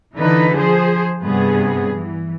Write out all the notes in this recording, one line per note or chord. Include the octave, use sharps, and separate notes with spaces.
D3 E3 D#4 B4
F3 G#4 C5
G2 C3 B3 G#4
E3